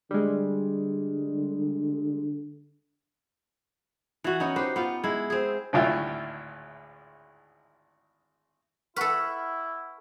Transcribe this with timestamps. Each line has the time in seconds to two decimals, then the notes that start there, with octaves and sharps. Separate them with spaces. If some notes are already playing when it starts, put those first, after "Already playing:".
0.11 D3 G3 G#3
4.24 E3 F#4
4.40 B3 C#4 D#4
4.56 G4 B4 C5
4.76 B3 F4
5.04 G#3 E4
5.30 C4 G#4
5.73 G#1 D2 A2 F4 E5
8.96 E4 A4 B4 F#5 C#6 F6